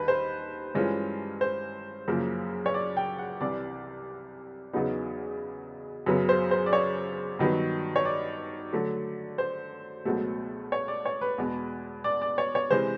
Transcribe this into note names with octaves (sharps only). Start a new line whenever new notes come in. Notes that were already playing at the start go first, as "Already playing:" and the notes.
Already playing: D#2 D#3 G3 B4
C5
G2 E3 G#3 C#4 F4
C5
F#2 C#3 F3 A#3
C#5
D5
G5
F#5
C2 C3 E3 D5
E2 C#3 F#3 B3 D#4
F#2 C#3 F#3 B3
C5
C5
D5
C#5
G2 D#3 F#3 B3
C#5
D5
D3 F#3 A3
C5
C#2 B2 F#3 A3
C#5
D5
C#5
B4
E2 B2 G#3
D5
D5
C#5
C#5
C3 E3 G#3 C5